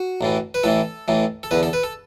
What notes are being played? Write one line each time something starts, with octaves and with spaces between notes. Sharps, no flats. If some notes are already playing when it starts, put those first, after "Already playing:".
Already playing: F#4
A1 A2 E3
B4
A1 A2 E3 A4
A1 A2 E3
A4
E2 D3 B4
A4
B4
A4